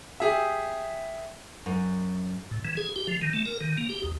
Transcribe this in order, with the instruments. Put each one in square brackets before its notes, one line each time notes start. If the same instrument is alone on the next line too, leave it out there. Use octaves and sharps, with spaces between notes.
[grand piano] G4 G#4 E5
[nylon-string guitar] F#2
[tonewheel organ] A2
E3
G#4
G4
F3
D#3
A3
A#4
D#3
A#3
G4
D#2